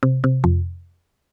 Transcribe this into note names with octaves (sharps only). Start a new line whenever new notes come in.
C3
C3
F2